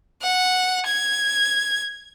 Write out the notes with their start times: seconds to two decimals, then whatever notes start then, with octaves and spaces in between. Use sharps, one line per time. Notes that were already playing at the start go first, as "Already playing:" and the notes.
0.22 F#5
0.86 G#6